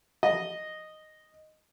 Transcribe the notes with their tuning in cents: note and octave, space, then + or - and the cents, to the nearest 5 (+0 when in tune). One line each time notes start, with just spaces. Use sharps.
D#5 -5